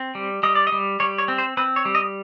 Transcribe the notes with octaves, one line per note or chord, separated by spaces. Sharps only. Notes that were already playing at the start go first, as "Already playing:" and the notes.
Already playing: C4
G3
G3 D#5
D5
D#5
G3
G3 C#5
C#5
C4
C5
C4 B4
C#5
G3
D#5